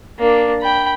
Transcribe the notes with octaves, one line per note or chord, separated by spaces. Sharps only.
A#3 D4
G5 B5